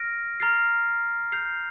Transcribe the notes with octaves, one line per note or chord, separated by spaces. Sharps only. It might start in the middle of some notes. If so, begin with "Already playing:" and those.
Already playing: F6 A#6 D7
A#5 F6 A6 C7
G6 C7 F7